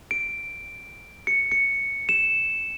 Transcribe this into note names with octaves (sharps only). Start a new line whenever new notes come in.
D7
C#7
C#7
E7